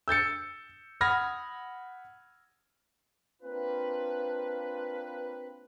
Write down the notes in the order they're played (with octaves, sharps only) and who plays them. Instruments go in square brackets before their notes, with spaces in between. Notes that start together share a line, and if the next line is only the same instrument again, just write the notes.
[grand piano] E6 G6 A6 C#7
F#5 B5 D#6 F6 G#6 A#6
[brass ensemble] A#3 C4 D4 F4 B4